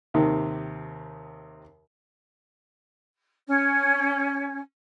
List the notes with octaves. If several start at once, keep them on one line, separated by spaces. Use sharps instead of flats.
D#2 C3 D#3
C#4